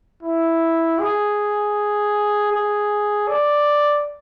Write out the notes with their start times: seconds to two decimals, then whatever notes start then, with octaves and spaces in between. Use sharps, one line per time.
0.23 E4
0.99 G#4
2.52 G#4
3.28 D5